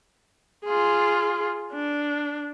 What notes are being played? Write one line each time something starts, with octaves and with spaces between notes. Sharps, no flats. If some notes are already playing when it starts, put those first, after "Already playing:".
F4 G#4
D4